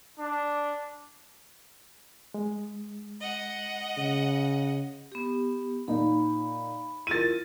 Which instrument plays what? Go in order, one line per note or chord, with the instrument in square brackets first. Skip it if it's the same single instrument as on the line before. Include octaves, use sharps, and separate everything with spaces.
[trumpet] D4
[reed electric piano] G#3
[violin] D#5 F#5
[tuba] C#3
[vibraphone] B3 G4
[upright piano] A#2 D#4 [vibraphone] B5
[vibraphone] E4 F4 A#4 [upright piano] A6 D#7